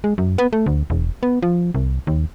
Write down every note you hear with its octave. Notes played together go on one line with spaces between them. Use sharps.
G#3
F#2
B3
A3
D2
E1
B3
F3
C2
D#2